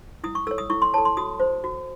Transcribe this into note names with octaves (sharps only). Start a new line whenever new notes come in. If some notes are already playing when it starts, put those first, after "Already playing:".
E4 D#6
C#6
A4 C#5 E6
D#6
E4 C#6
C6
A4 C#5 A5
C6
F#4 D#6
C5
F#4